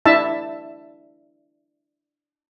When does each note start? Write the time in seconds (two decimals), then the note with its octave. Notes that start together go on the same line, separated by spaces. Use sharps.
0.06 D4 E4 E5 A5